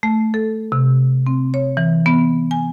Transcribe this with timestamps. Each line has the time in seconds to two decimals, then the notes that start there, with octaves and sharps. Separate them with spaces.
0.03 A3
0.34 A4
0.72 C3
1.27 C4
1.54 C#5
1.77 E3
2.06 B3
2.51 G#5